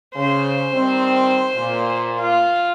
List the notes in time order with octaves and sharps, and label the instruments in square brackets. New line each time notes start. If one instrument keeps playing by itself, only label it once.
[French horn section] C#3 [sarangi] C5
[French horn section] D#3 G3 C4
A#2
[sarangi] F4